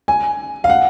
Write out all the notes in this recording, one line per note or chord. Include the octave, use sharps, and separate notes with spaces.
G#5
F5
F#5